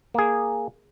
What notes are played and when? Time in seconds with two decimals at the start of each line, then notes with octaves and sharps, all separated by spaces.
0.14 A#3 G#4